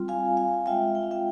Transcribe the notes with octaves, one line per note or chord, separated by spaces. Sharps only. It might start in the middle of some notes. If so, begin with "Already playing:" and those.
Already playing: G3 C4 F4
F5 G#5
F5 G#5
G#3 C4 F4 E5 G5
G5
F5
E5 G5